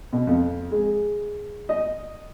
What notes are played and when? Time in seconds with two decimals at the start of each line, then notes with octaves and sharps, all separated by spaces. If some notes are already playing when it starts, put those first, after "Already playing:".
0.13 B2
0.27 F2
0.71 G#3
1.69 D#5